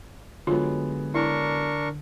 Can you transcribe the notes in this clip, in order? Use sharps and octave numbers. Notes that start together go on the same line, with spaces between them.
D3 F#3 G#3 B3 F4
D4 E4 A#4 C#6